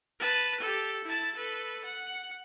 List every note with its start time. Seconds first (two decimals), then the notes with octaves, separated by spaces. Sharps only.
0.19 B4 A5
0.60 G4 A4
1.05 E4 A5
1.36 A4 B4
1.85 F#5